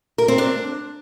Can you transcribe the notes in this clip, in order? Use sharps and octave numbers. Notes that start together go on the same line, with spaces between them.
A#4
C4
D4